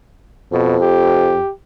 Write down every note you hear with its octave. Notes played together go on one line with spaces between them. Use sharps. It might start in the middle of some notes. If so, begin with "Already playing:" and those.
F2 B2
G4